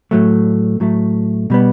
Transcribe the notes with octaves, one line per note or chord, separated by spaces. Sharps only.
A2 F#3 A3
A2 F#3 A3
B2 G3 B3